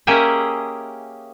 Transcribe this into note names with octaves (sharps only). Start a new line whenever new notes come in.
A#3 C#4 G4 G#4 D#5 E5